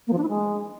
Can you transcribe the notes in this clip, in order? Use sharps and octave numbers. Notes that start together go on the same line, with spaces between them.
A#3
F3
D4
E4
G#3